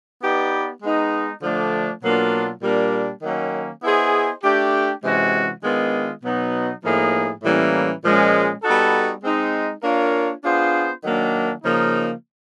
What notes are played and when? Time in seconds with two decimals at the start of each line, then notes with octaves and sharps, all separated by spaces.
0.23 B3 D#4 G4 B4 D5
0.83 G#3 B3 D#4
1.42 D3 F3 A3 D4
2.03 B2 F#3 A#3 D4 F4
2.62 A#2 G3 A#3 D4
3.23 D#3 F#3 A#3 C#4
3.83 B3 E4 G#4 C5 D#5
4.44 A3 D4 G4
5.04 C3 E3 G#3 C#4 F#4
5.63 D#3 G#3 B3 D4 F4
6.23 B2 F#3 B3 D#4
6.84 A2 F3 A#3 D#4 G#4
7.43 A2 E3 G3 A#3 C#4
8.03 A#2 F3 G#3 C#4
8.63 G3 B3 D#4 F#4 A4
9.24 G#3 C4 D#4
9.83 A#3 D4 F4 A#4 C#5
10.44 B3 D4 F4 G#4 C5
11.04 D#3 F#3 A#3 D4
11.63 C#3 F3 A#3 D#4